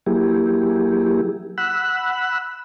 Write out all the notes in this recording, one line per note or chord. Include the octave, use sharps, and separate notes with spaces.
F#3 A#3 E4 G4 G#4
F#5 B5 E6 F#6